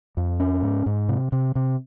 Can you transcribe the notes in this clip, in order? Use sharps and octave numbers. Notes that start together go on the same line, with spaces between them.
F2
C#4
G#2
G#2
C3
C3
C3